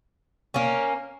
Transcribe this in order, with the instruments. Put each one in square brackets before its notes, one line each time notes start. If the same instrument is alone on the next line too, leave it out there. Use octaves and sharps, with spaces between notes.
[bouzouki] A#3 C#4